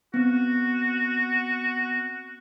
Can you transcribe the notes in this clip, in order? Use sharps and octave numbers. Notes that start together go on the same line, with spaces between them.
B3 C4 F#4